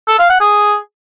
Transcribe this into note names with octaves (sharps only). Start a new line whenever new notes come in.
A4
F5
F#5
G#4